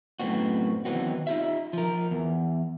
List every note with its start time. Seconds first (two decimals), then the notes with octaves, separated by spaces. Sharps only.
0.20 F#2 A2 C#3 B3 C4 F#4
0.85 D#3 E3 F#3 B3 C4 F#4
1.27 D#4 F4 G4 E5
1.73 F3 A#4
2.11 E2